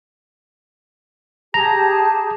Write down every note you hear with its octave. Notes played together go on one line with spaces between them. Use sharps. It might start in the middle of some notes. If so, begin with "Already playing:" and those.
G4 G#4 A5 A#5